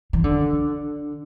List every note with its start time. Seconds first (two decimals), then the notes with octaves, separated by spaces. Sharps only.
0.13 E3
0.24 D3